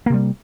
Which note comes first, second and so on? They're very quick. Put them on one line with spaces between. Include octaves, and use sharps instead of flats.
A#3 C3 G3